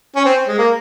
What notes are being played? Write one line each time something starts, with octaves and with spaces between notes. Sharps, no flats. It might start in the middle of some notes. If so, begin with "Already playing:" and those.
C#4
C4
G#3
A#3